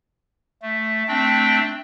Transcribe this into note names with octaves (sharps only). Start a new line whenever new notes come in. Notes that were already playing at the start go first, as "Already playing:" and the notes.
A3
A3 C4 D4 G5